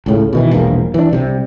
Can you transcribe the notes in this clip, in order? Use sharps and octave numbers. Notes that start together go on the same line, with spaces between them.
C#2 A2 C#3
B2 D#3 E3
E1 A#1 G2 A#3
E3 D4
C2 C3 G3